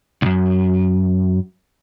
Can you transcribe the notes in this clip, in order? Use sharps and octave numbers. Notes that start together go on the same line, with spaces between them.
C2 F#2